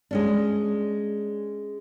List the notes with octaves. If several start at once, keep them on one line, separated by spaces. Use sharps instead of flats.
G#3 C#4 D4